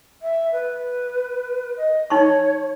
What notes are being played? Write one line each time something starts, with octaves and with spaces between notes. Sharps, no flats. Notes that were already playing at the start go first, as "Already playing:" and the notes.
E5
B4
D#5
D#4 C#5 C6 C#6